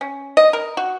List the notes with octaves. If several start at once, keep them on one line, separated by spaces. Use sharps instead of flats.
C#4
D#5
A#4
F#4